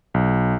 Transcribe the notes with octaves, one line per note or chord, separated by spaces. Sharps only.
B1